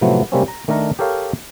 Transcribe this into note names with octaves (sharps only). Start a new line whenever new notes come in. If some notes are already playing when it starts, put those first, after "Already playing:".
A2 C3 F3 F#3 A3 B3
C3 G3 G#3 A#3 C4 C#4
A#5
D#3 A3 D4 A4 A#4 A#5
G4 A4 A#4 C#5 F5 G5